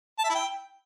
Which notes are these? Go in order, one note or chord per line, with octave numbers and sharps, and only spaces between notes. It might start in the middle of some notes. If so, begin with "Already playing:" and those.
A5
E5
E4
G5